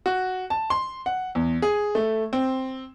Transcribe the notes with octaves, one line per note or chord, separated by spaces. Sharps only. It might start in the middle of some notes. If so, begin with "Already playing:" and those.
F#4
A5
C6
F#5
E2
G#4
A3
C4